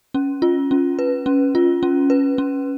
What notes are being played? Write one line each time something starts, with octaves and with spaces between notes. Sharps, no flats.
C#4
F4
C#4
B4
C#4
F4
C#4
B4
C#4